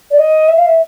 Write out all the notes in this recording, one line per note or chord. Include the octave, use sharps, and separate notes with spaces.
D5
D#5
E5
F5
E5